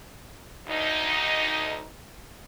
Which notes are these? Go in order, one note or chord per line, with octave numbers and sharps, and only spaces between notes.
D2 D#4